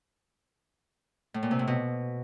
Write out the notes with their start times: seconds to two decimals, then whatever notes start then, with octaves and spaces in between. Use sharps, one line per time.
1.34 A2
1.43 A#2
1.51 C3
1.59 A2
1.67 B2